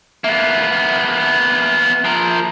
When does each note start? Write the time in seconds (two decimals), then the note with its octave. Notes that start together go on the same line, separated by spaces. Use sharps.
0.24 A#3 B3 E5
2.05 F3 A#4